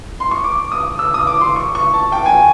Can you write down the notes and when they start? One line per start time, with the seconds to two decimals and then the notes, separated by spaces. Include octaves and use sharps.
0.20 C6
0.31 C#6
0.44 D6
0.72 D#6
0.99 E6
1.14 D#6
1.27 D6
1.41 C6
1.56 C#6
1.75 C#6
1.94 A5
2.12 G5
2.26 G#5